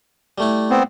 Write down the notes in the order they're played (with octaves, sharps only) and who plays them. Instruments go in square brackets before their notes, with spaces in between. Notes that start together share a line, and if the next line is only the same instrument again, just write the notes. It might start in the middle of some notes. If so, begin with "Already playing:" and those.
[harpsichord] G3 A3 E4
[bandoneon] B3 C4